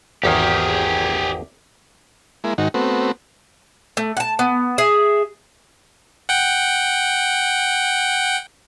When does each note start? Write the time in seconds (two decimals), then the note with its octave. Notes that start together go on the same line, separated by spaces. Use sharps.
0.23 G#1 E2 D#3 G4 G#4
2.44 G#3 A#3 E4
2.58 G#2 D#3 D#4 F#4
2.74 A3 B3 C4 F#4
3.97 A3
4.17 F#5 A5
4.39 B3
4.78 G#4 E5
6.29 F#5 G5